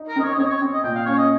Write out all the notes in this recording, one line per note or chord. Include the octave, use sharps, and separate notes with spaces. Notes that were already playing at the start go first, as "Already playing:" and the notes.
Already playing: D#4
A#4
C4 D#5
C#5
D#5
C4 C#5
D#5
C#5
C4
D#5
A#2 G5
F5
C#4 C#5
D#5